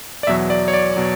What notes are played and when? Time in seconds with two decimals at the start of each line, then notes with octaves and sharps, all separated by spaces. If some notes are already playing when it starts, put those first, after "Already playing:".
0.23 D5
0.27 E2 B2 F#3 E5
0.50 D5
0.68 C#5
0.74 D5
0.97 B2 F#3